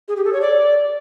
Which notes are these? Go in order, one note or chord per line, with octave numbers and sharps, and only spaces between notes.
G#4
G4
A4
C#5
D5